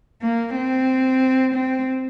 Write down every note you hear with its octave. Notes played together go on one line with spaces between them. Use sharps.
A#3
C4
C4